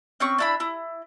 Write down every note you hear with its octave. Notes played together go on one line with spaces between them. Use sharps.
C4 C#4 C#6
D4 E4 B5
E4